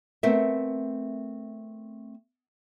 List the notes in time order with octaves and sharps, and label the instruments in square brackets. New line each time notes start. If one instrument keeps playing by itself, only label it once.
[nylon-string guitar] A3 B3 C4 A#4 C#5 E5